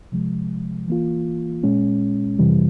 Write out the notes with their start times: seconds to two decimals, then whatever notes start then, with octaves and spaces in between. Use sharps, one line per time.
0.12 C3 F3 G#3
0.88 E3 A#3 F4
1.64 A#2 G#3 C#4
2.39 F2 C3 E3 G3